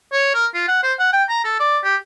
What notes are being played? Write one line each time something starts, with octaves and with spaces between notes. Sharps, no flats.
C#5
A#4
F4
F#5
C5
F#5
G5
A#5
A4
D5
G4